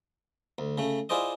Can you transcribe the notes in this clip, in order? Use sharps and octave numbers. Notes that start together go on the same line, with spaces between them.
D2
C#3 A3
E4 F4 G#4 C5 D5 D#5